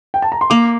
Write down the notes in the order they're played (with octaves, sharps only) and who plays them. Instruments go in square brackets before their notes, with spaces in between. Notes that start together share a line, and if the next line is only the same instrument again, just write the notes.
[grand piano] G5
A5
A#5
C6
[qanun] A#3 [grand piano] D6